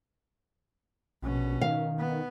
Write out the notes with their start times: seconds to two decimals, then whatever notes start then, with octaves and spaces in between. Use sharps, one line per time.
1.22 A#1 B2 C#4
1.61 D#3 F5
1.99 B3